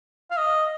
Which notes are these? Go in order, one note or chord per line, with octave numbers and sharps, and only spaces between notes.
F5
D#5